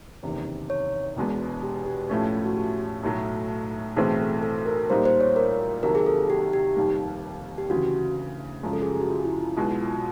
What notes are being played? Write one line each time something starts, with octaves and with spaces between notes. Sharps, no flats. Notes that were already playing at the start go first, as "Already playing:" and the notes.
F#1 E2 C3 D#3
C#5
E1 E2 B2 G#3 B3
G4
G4
A2 F3 A3 C#4
F4
F#4
G4
B1 A2 F#3 A3
B1 A2 E3 A3 C4 G#4
A4
A4
A#4
A#2 G3 A#3 D#4 C5
C5
C#5
A#4
C2 C3 D#3 F#3 A#4
G#4
A4
G4
G4
F1 D#2 D#3 G3
G4
D2 C#3 E3 F#4
F#2 C#3 F3 G#3
A4
G#4
G4
F#4
F4
E4
F4
B1 B2 G#3 E4
F#4
F4